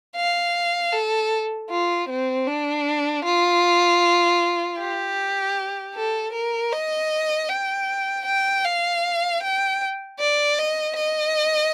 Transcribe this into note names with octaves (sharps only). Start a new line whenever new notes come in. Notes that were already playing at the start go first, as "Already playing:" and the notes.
F5
A4
F4
C4
D4
F4
G4
A4
A#4
D#5
G5
G5
F5
G5
D5
D#5
D#5